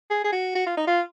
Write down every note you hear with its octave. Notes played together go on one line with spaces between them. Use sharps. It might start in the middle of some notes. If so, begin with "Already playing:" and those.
G#4
G#4
F#4
F#4
F4
D#4
F4